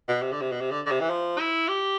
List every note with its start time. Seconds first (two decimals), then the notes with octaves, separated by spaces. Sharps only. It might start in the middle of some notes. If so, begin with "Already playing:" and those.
0.08 B2
0.22 C3
0.32 D3
0.42 C3
0.52 B2
0.61 C3
0.71 D3
0.86 D3
0.91 C3
1.00 E3
1.10 F3
1.39 E4
1.68 G4